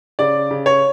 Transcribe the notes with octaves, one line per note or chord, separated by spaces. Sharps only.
C#3 D5
C#3
C#5